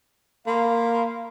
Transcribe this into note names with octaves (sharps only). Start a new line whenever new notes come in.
A#3 F5 B5 C6